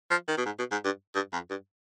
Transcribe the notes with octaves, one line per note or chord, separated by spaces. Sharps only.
F3
D#3
B2
G#2
B2
G#2
G2
G2
F2
G2